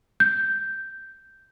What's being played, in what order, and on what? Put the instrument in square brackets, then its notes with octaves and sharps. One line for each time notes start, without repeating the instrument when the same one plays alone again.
[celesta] G6